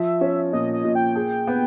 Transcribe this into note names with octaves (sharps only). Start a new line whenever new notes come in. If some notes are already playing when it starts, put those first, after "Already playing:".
Already playing: F3 E5
C#4
A#2 D#5
D#5
A#2
G5
G#4
B3